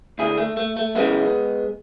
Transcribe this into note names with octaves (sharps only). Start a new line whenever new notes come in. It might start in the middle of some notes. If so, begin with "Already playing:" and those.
D2 D3 E4 G#4
A3
A3
A3
F#2 C#3 E3 G#3 B3